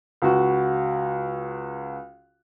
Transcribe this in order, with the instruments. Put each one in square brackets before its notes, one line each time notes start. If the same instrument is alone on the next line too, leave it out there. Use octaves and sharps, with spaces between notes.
[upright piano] C#2 F#4